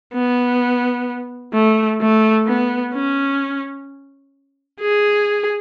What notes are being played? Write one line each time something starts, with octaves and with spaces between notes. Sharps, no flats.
B3
A3
A3
B3
C#4
G#4